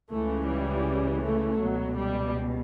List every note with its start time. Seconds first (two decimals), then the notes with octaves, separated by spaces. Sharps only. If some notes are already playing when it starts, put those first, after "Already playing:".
0.10 C#2 C#3 E3 A3
0.49 G3
1.23 A3
1.60 C#2 B2 F#3
1.98 G3